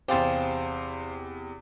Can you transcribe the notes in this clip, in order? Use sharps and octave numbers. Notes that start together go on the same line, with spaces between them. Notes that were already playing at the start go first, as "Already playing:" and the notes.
E2 C3 G4 G#4 C5 F5 A5 C6